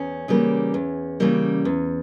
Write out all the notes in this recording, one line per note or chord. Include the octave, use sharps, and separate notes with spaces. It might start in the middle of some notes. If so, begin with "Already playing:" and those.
Already playing: E2 C#4
C#3 E3 G3 A#3
E2
C#3 E3 G3 A#3
E2